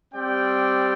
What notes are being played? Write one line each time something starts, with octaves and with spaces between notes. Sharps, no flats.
G3 C4 G4 D5 G5